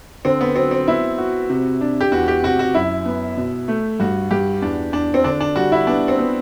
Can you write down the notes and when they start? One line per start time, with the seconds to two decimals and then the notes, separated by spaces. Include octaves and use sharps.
0.25 D3 C4
0.41 B3
0.56 F#3 C4
0.71 C4
0.88 B3 E4
1.18 F#4
1.50 C3
1.81 D4
2.01 G4
2.12 E2 F#4
2.28 G4
2.43 C3 F#4
2.59 F#4
2.74 F#2 E4
3.06 B3
3.37 B2
3.68 A3
4.00 G2 F#4
4.31 G2 G4
4.62 E2 D4
4.93 E2 D4
5.14 C4
5.24 D3 D4
5.40 D4
5.56 G3 F#4
5.72 E4
5.87 B3 D4
6.08 C4
6.18 B3